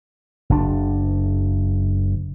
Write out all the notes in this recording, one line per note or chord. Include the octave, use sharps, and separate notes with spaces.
F#1 D4